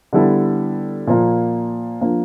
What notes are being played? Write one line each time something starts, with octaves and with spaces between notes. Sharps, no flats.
D3 G3 B3 E4 A4
A#2 F3 A#3
F3 A#3 D4